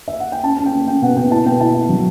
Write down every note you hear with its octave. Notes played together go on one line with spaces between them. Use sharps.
E5
F#5
G5
C#4 A5
C#4 A5
G5
C#4
C#4 G5
B2 F#5
B2 G5
E4 A5
B2 G5
E4 A5
E4
F#3